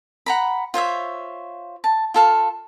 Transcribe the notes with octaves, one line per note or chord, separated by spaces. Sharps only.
F#5 A#5 B5
F4 C5 C#5 E5
A5
F4 A4 F5